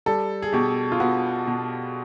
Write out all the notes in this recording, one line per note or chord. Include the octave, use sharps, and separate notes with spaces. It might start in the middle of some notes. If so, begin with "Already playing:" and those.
G3 A4
G#4
B2 G4
F4
B3 F#4
B2